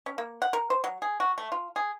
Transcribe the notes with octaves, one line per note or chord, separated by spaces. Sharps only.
C#4
A#3
F#5
A#4
C5
F#3
G#4
F#4
A3
F4
G#4